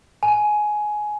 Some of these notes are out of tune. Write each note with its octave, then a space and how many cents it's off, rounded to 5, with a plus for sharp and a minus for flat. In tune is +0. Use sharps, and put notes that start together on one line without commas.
G#5 +15